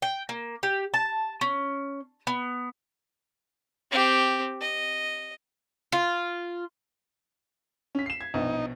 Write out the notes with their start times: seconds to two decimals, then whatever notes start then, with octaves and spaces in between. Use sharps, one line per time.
0.02 G5
0.29 A#3
0.63 G4
0.94 A5
1.41 C#4
2.27 B3
3.91 C4 G4
4.61 D#5
5.92 F4
7.95 C#4 B6
8.06 C7 E7
8.21 G#6
8.34 A#1 B2 D#4